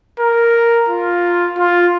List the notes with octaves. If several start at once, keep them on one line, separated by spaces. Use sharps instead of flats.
A#4
F4
F4